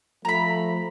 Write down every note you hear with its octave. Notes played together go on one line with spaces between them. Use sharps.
F3 A3 A#5 B5